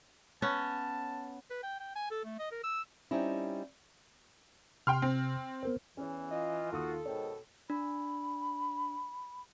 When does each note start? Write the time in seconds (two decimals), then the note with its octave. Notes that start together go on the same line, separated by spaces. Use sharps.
0.42 B3 C#4 A5
1.50 B4
1.63 G5
1.80 G5
1.95 G#5
2.11 A4
2.25 A3
2.39 D#5
2.52 A#4
2.64 E6
3.11 G3 C4 C#4 D#4 E4
4.87 C3 G5 C6 F6
5.02 C4
5.63 B3 A#4 C5
5.97 E2 E3 C#4 C#5
6.31 F4 D#5
6.72 D#2 F#4 A4 D#6
7.05 G#2 B2 D#3 C#5 G5
7.70 D4 B5